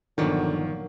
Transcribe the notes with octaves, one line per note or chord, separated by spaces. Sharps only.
G1 A#2 D3 D#3 F3 F#3 A#3